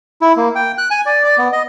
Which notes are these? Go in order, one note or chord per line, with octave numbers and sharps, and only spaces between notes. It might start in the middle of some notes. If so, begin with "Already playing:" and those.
E4
A#3
G5
F#6
G#5
D5
D5
B3
D#5